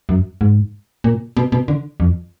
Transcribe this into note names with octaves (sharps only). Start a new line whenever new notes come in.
F#2
G#2
A#2
B2
B2
D3
F2